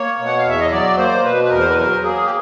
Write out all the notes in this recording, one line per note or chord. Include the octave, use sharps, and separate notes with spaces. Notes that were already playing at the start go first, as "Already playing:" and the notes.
Already playing: A#3 C#5
B2
F#5
F5
E2 E5
D#5
F#3 D5
A#3 C5
B2 B4
B4
E2 A#4
C5
B4
F#3 A#4
A#3 G#4
G4